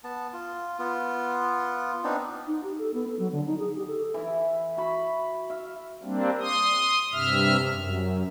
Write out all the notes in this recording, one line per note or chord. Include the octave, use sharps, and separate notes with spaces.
B3 A5
F4
B3 F4
B3 C4 D4 D#4
D#4
G4
A4
B3
A4
F#3
D3
D#4
G#4
G4
A4
E3 E4
F#4 B5
E5 F5
G3 A#3 C4 D4
C6 D#6
G2 C3 E5 F6
F#2